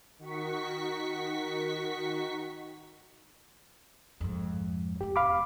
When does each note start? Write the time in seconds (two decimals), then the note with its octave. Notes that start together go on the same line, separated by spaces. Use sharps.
0.19 D#3 F#4 C#6 B6
4.20 F2 G#2
5.01 C4 F4 G4
5.16 E1 F5 B5 D6